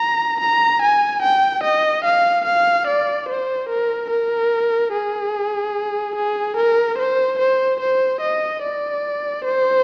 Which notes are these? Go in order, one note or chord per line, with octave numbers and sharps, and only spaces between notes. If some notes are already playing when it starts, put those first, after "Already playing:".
Already playing: A#5
A#5
G#5
G5
D#5
F5
F5
D5
C5
A#4
A#4
G#4
G#4
A#4
C5
C5
C5
D#5
D5
C5